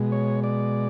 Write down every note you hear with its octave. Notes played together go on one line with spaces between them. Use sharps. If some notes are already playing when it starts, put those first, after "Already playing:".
Already playing: B2 G#3
C#5
D5